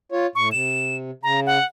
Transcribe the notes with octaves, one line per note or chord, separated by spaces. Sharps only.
F4 C#5
A2 C#6
C3 E7
C#3 A#5
F#5